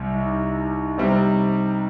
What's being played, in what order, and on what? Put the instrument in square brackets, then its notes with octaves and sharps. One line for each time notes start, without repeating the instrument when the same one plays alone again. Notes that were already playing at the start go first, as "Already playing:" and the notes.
Already playing: [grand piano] C2 C3 G3
[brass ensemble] D#4
[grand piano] C3 G3 C4